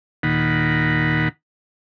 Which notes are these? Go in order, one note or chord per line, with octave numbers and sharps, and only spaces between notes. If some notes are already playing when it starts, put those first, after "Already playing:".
D#2 A#2 D#3 F#5 B5